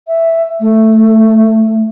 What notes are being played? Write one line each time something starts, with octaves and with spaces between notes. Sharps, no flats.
E5
A3